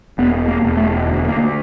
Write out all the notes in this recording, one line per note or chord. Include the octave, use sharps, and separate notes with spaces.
E1 B3
A#3
E1
A3
D2
A#3